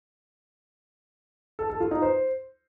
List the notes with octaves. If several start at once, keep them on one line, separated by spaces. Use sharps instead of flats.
A4
A4
F4
D#4
C5